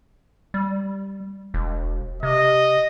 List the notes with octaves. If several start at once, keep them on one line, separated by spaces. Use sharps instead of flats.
G3
E1
C3 D#5